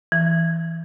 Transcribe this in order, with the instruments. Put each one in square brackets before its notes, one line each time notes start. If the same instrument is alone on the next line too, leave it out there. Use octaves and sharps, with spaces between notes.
[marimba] E3